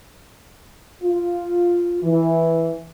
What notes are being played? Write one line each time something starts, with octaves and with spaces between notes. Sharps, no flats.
F4
E3